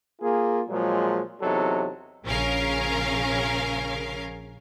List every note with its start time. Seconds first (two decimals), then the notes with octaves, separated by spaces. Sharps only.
0.20 A#3 F4 G#4
0.69 A#2 F3 F#3 G#3
1.41 E2 C3 F#3 D#4 A4
2.24 A#1 C#3 C#4 A#4 F5